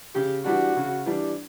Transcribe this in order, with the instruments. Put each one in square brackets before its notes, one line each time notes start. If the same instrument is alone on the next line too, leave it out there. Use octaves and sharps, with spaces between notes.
[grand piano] C#3 [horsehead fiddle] G4
[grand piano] E3 G3 D4 [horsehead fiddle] F#4
[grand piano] C#3
E3 G3 D4